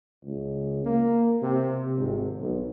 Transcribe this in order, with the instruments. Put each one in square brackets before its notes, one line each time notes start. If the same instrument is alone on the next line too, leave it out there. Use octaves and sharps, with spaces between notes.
[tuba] C#2
A#3
C3
G#1
B1